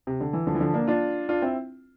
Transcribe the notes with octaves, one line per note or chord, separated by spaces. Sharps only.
C3
D3
E3
D3 F3
E3
D3 F3
A#3 D4
D4 F4
D4 F4
C4 E4